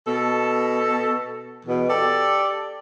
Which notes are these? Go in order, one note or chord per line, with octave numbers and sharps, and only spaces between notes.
B2 A4
E2 B2
G4 A4 D5